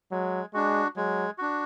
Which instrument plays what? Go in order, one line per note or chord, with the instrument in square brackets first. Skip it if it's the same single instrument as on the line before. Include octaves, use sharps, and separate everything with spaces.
[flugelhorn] F#3 [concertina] G#3
[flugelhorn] G#3 [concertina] D4 F#4
[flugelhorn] F#3 [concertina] G#3
[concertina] D4 F#4